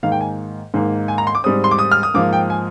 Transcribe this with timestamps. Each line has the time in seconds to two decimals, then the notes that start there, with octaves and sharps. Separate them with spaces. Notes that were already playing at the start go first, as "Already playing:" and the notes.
0.03 G#2 D#3 A#3 F5
0.12 G5
0.21 G#5
0.74 G#2 D#3 A#3
1.08 G#5
1.18 A#5
1.27 C6
1.35 D6
1.44 G#2 G3 C4 D#6
1.64 C6
1.71 D6
1.79 D#6
1.92 F6
2.03 D#6
2.14 G#2 F3 A#3 D6
2.33 G5
2.50 G#5